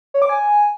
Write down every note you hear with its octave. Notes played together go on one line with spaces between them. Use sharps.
C#5
D6
G#5